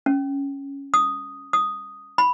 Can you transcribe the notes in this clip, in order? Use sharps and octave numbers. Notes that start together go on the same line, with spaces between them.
C#4
D#6
D#6
B5